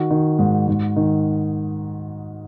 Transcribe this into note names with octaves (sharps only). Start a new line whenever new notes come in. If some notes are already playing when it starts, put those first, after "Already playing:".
Already playing: D#3 F#4
D#3
G#2
G#2
D#3